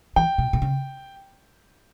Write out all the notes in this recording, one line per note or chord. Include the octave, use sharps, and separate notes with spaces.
E3 G5
B2
B2
C#3